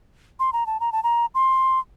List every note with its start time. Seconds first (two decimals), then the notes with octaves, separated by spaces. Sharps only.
0.40 C6
0.53 A#5
0.66 A5
0.80 A#5
0.92 A5
1.03 A#5
1.35 C6